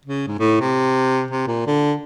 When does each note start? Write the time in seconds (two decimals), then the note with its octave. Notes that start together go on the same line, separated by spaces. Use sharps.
0.06 C#3
0.28 G#2
0.40 A2
0.61 C3
1.31 C3
1.48 A#2
1.67 D3